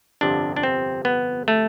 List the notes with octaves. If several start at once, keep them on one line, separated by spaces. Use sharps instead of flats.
G1 F2 C3 D4
D4
C4
B3
A3